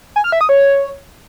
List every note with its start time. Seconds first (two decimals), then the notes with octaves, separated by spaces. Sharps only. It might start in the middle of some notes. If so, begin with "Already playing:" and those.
0.16 G#5
0.24 F6
0.32 E5
0.41 D#6
0.49 C#5